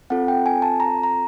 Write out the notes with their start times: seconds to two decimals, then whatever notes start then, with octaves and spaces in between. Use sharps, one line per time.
0.10 C4 F4 A4 F#5
0.28 G5
0.46 G#5
0.62 A5
0.80 A#5
1.03 A#5